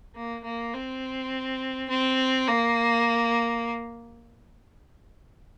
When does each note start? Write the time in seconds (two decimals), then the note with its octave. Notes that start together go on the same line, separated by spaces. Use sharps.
0.16 A#3
0.44 A#3
0.73 C4
1.89 C4
2.48 A#3